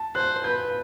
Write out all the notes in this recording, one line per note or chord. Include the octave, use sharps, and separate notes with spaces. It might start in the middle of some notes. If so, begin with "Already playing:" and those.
Already playing: A5
C5 F#6
B4 G6